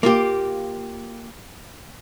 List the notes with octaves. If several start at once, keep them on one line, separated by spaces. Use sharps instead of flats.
A#3 F4 G4